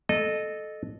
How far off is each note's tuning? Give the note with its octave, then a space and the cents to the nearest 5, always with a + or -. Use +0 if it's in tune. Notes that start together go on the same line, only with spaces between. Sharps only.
A4 -15 D#5 -20